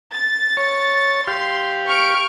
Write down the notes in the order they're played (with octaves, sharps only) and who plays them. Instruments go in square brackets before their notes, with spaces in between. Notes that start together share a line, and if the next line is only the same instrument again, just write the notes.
[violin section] A6
[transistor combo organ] C#5
[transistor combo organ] G4 F5 [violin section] C6
[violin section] C#6 F6 D7